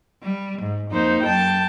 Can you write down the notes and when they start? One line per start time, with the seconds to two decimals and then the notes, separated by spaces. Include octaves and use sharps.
0.23 G3
0.62 G#2
0.91 F2 A#3 D#4 C5
1.22 F#2 G5 A5